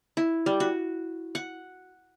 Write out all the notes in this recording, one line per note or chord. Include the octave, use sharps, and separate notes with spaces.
E4
G3
F#4
F#5